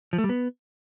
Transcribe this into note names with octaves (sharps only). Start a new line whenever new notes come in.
F3
A3
G3
B3